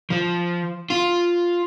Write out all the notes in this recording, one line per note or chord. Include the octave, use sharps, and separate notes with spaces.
F3
F4